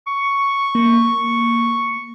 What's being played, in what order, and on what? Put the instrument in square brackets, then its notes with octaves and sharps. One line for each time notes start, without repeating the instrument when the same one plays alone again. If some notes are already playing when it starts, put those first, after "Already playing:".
[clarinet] C#6
[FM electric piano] A#3